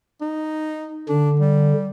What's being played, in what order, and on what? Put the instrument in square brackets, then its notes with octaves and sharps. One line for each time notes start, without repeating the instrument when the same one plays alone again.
[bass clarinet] D#4
[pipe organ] D3 [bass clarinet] D4
[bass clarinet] G3